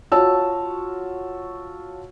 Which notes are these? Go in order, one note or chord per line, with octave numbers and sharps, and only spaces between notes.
F4 F#4 C#5 A5 E6